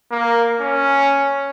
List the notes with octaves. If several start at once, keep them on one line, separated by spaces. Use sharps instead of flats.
A#3
C#4